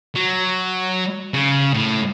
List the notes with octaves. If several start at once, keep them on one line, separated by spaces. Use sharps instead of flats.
F#3
C#3
A2